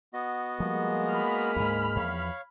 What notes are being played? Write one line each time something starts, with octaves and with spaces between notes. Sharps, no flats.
B3 F#4 D#5
F3 G3 G#3 A#3
B5 F6
D2 G#2 G#5
E2 F3 C#5 F5